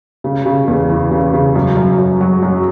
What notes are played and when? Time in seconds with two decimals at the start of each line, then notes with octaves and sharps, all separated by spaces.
0.24 C#3
0.46 C#3
0.68 E2
0.89 E3
1.11 C#3
1.33 C#3
1.56 F#2
1.77 F#2
1.98 F#2
2.21 F#3
2.42 F#2